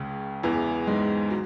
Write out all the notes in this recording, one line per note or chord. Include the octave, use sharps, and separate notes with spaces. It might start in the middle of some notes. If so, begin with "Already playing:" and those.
Already playing: C#2 C#3
E2 E3
G#2 G#3
F#3